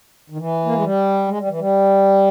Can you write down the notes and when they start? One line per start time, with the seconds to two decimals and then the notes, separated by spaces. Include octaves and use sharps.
0.30 D#3
0.38 E3
0.65 A#3
0.74 G#3
0.82 G3
1.28 G#3
1.38 G3
1.49 E3
1.59 G3